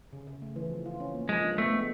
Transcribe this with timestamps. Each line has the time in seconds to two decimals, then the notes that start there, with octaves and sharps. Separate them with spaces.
0.13 C#3
0.27 C#3
0.42 A3
0.56 E3
0.70 F3
0.86 F4
1.00 C#4
1.15 A#3
1.29 F3 G#3
1.44 D4
1.58 A3 B3
1.72 G#3